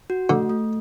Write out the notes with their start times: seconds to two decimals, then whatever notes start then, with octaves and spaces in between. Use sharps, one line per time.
0.10 F#4
0.30 D3 A3
0.50 A3